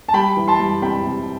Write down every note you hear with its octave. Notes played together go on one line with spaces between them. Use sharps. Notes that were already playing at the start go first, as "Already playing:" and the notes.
A5
G3 G5 B5
E3
A5 C6
G3
C3 G5 B5
C3